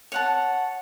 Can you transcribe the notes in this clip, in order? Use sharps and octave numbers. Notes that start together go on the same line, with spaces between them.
C#5 F#5 A5